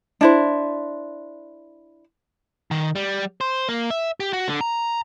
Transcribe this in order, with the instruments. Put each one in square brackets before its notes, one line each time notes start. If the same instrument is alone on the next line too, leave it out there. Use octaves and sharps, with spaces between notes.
[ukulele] D4 E4 C5
[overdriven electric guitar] D#3
G3
C5
A#3
E5
G4
F#4
D3
A#5